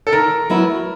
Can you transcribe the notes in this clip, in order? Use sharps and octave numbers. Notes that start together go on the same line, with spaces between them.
A4
D#3 A#4
F#3 B3 E4